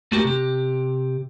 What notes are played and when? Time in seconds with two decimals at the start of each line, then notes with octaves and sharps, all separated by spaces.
0.12 A3 F#4 G4 A#4
0.25 C3 G4